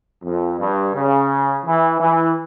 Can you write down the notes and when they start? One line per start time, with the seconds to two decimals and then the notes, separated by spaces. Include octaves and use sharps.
0.22 F2
0.59 G2
0.94 C#3
1.64 E3
2.00 E3